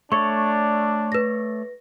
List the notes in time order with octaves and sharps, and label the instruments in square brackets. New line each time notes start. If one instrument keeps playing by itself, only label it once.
[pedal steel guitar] A3 C#5 D5 [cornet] D4 [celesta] C#6
[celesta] B4 A#6